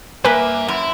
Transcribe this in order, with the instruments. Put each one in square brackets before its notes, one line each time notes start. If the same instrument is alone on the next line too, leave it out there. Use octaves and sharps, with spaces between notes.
[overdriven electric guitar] G2 E5 [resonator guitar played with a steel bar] A#3 G#5 [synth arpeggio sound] B4
[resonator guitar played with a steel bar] F#2 [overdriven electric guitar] E4